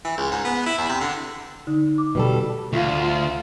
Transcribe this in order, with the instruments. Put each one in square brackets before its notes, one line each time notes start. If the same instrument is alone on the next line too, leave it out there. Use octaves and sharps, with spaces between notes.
[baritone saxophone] E3
C#2
G#2
B3
E4
E2
C3
D3
[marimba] D3 D#4
D6
[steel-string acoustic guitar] B2 G3 A4
[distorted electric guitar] D2 [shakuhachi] F4